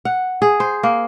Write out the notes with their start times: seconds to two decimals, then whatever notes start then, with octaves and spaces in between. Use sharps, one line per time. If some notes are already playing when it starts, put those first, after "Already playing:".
0.05 F#5
0.42 G#4
0.60 C5
0.83 A#3